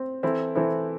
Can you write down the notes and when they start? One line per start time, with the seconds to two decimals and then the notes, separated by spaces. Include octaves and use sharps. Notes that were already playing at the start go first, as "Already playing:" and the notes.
Already playing: C4
0.23 E3 C4 E4 A4
0.55 E3 C4 E4 A4